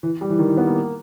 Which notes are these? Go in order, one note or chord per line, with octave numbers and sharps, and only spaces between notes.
E3
G3
E3
D#3
E3
B3
A#3